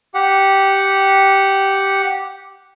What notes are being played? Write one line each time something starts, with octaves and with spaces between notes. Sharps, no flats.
G4 F#5